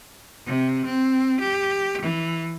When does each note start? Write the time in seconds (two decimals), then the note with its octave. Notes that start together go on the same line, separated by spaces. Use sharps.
0.46 C3
0.86 C4
1.40 G4
2.01 E3